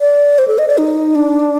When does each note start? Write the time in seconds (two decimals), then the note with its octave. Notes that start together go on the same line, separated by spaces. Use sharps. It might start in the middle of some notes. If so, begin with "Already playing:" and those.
0.01 D5
0.38 C5
0.48 A4
0.58 D#5
0.68 D5
0.78 D#4
1.15 D4